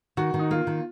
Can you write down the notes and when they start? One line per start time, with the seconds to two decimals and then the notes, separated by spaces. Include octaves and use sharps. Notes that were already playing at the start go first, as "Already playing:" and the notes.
0.17 D#3 F#4
0.34 D#3
0.39 D#4
0.51 A#3 F4
0.67 D#3